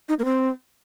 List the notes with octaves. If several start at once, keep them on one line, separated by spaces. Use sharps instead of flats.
D#4
A#3
C4